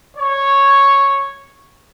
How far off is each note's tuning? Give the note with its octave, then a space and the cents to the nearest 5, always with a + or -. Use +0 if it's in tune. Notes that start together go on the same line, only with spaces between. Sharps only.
C#5 -5